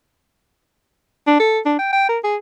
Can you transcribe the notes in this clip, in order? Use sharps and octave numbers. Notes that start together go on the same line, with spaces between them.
D4
A4
D4
G5
G5
A#4
G#4